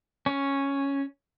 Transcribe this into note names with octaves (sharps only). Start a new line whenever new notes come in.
C#4